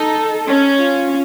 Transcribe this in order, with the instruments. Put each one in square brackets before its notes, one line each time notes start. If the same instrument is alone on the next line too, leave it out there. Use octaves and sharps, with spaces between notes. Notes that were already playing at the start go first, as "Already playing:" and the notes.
Already playing: [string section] D#4 [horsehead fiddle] A4
[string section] C#4
[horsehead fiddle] F4